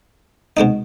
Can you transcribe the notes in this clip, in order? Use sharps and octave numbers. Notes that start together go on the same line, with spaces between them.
B2 G#3 C4 D#4